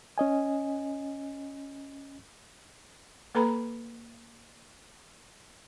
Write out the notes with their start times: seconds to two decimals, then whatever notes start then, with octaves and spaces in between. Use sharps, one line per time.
0.18 C#4 D#5 G#5
3.35 A#3 A4 B4 A#5 B5